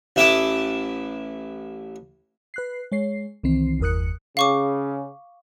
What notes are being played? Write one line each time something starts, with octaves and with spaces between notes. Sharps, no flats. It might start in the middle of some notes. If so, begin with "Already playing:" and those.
A1 E4 E5 A5 D6 D#6
B4 F#6 C7
G#3 C#5 C7
C2 D#3 E3 C4 C7
G1 E2 A#4 D#6 F#6 C#7
C#3 F5 C#6 D6